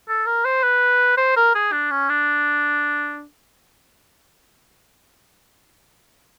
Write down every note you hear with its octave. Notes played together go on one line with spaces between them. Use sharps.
A4
A#4
C5
B4
C5
A#4
G#4
D4
C#4
D4